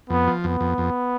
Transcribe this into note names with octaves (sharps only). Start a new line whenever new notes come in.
F2 B3
F3
F2 B3
F2
F2